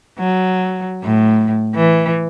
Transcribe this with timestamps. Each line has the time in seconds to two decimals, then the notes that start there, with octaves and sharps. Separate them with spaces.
0.18 F#3
1.03 A2
1.75 E3